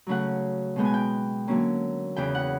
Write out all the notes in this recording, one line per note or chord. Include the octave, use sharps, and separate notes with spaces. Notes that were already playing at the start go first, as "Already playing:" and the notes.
C#3 F#3 A3 C#4 F#5
B2 G#3 B3 G5
G#5
G5
D3 F#3 A#3 C#4
E2 C#3 E3 G5
F#5